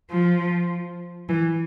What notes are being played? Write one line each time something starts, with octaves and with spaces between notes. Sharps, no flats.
F3
E3